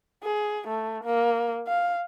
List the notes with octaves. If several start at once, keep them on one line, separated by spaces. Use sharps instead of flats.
G#4
A3
A#3
F5